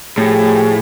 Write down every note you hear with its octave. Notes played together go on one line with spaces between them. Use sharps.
A2 F3 G4 G#4